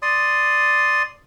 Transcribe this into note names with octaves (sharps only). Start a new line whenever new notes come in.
D5 C6 D#6